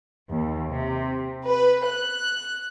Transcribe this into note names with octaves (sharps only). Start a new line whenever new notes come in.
D#2
C3
B4
F#6